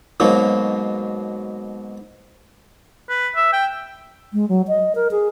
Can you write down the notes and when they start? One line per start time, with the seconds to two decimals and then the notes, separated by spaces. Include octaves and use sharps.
0.20 G#2 B2 F#3 A#3
3.10 B4
3.36 E5
3.53 G5
4.33 G#3
4.49 F#3
4.68 D#5
4.95 A#4
5.11 G#4